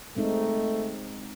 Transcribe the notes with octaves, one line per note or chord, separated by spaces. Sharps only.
G#3 A3 C4 D#4